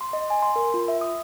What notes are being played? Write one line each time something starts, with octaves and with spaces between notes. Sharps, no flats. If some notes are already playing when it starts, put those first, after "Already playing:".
C6
D#5
G#5
C6
A#4
F4
E5
D#6